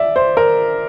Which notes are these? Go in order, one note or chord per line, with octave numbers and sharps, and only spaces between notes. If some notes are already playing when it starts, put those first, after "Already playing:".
Already playing: D5 E5
C5
A#4